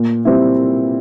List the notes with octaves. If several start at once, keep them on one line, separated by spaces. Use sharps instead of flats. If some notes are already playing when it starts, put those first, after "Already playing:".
Already playing: A#2
G3 C4 E4